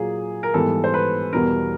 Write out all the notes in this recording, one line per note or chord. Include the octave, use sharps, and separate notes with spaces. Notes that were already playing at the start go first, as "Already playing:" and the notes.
Already playing: A#2 F#3 A#3 G#4
A#4
G#2 E3 G3 B3 A4
C5
B4
E2 B2 G3 B3 A#4